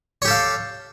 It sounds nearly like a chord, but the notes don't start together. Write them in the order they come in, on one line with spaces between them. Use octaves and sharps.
C#5 G4 A4 F5